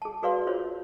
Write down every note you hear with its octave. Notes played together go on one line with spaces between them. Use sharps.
G#4 A5
F#4 G#4 B4 D5 F5 C6
F4 C5 C#5